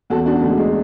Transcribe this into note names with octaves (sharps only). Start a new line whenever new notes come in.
E2 F#4 A4
D4 F#4
D3 G#3 A3
G#3